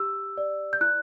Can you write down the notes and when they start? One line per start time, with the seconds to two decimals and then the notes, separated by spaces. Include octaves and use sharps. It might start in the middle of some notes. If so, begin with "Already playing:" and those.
Already playing: G4 E6
0.37 D5
0.73 G6
0.81 E4 F#6